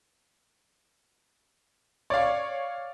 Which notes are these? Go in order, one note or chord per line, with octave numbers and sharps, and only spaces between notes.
C#5 D5 F5